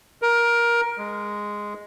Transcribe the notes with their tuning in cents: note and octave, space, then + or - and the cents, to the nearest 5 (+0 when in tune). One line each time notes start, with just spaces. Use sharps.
A#4 +15
G#3 -5